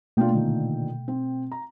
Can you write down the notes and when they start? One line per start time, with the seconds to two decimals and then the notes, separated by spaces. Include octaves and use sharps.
0.17 B2 A3 A#3 D4 F4 G5
0.32 A#2 D3 D#3
1.08 C4
1.52 A#5